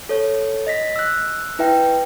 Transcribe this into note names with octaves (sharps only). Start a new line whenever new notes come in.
A4 C#5
D#5 A#6 B6
E6 F#6
E4 B4 E5 G5